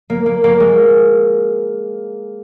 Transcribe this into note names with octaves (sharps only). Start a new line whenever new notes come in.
A#3
A#3
A#3
G#3